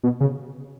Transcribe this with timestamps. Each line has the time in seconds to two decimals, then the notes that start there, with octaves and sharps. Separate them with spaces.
0.04 B2
0.20 C#3